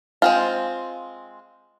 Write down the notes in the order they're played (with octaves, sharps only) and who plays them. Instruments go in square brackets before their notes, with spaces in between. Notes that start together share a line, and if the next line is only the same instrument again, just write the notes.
[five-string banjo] G#3 C4 F4